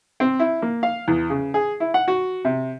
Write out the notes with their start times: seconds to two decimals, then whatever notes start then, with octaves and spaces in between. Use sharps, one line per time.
0.20 C4
0.39 E4
0.62 A#3
0.83 F5
1.08 E2
1.30 C#3
1.54 G#4
1.80 E4
1.94 F#5
2.08 F#4
2.45 C3